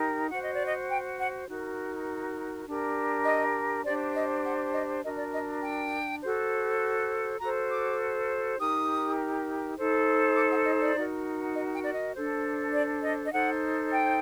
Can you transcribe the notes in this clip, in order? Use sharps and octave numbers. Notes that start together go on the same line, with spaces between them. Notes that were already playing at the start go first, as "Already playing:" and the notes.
Already playing: D#4 G4 A#4
F#4 C5 F#5
D#5
D5
D#5
G5
F#5
D#4 F#4 A#4
D4 G4 A#4
D#5
D4 G4 C5 D5
D#5
F#5
D#5
D4 F#4 A#4 D#5
D5
D#5
G5
F#4 A4 C5
F#4 A4 C5 A#5
D6
D#4 G4 A#4 D#6
D#4 A4 C5
D6
F#5
D#5
D5
D#4 F#4 A#4
D#5
G5
D5
D#5
D4 A4 C5
D5
D#5
D#5
D#4 A4 C5 F#5
G5